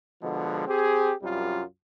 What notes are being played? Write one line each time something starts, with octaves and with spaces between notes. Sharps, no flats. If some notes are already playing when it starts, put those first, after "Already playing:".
B2 D3 F3 G#3
C4 G4 G#4
C2 F#2 G3 F4